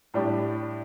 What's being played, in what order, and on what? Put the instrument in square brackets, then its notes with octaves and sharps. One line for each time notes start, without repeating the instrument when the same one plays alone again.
[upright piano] A2 G3 D4 G4